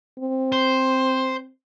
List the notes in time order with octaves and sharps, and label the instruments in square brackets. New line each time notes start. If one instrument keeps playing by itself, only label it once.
[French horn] C4
[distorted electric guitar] C5